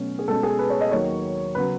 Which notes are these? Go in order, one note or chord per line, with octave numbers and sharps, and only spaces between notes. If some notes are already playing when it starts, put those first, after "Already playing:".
Already playing: B2 F#3 A3 C#4
G#4
B2 G#3 C#4 A4
G#4
B4
C#5
D#5
D#2 D#3 F#3 C#5
C#3 F#3 B3 B4